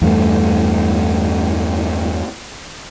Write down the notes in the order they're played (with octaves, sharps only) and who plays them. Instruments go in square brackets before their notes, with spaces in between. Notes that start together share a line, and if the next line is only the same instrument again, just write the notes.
[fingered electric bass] E2 G2 A3